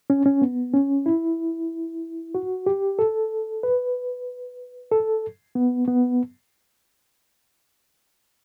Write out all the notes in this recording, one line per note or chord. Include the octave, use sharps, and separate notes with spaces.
C#4
C#4
B3
C#4
E4
F#4
G4
A4
B4
A4
B3
B3